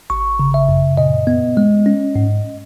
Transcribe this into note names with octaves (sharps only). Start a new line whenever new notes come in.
G#1 C#6
C#3
E5
F#2
A#2 D#5
B3
G#3
C#4
G#2